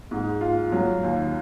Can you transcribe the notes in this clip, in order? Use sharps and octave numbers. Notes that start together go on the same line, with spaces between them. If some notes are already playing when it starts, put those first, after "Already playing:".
G#2
F4
F#3
D#2